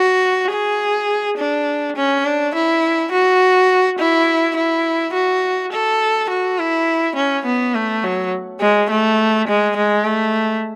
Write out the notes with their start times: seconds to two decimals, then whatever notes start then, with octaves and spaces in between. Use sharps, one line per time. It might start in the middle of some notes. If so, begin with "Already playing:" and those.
Already playing: F#4
0.52 G#4
1.38 D4
1.96 C#4
2.25 D4
2.55 E4
3.12 F#4
3.99 E4
4.57 E4
5.14 F#4
5.73 A4
6.30 F#4
6.59 E4
7.16 C#4
7.46 B3
7.74 A3
8.04 F#3
8.60 G#3
8.90 A3
9.48 G#3
9.77 G#3
10.05 A3